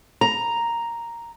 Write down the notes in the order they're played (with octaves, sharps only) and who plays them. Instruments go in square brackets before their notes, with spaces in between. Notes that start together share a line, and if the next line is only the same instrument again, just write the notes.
[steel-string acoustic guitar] A#5